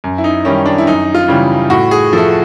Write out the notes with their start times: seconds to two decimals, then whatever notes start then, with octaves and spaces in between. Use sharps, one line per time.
0.04 F#2
0.18 E4
0.24 D#4
0.45 D#3 G3 C#4
0.66 D4
0.78 E4
0.87 F#2 D#4
1.15 F4
1.28 C#3 E3 G3
1.70 A2 F#4
1.91 G#4
2.13 F3 A3 A4